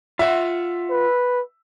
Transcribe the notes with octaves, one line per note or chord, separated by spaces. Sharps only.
F4 E5 F#5
B4